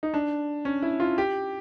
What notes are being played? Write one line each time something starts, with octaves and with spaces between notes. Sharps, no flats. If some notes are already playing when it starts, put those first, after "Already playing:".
D#4
D4
C#4
E4
F4
G4